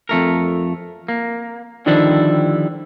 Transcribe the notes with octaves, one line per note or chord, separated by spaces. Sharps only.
F2 A3 A#4
A#3
D3 D#3 F3 G3 D4 E4